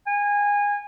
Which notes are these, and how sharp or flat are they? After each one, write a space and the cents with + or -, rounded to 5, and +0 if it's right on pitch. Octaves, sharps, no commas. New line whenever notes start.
G#5 -25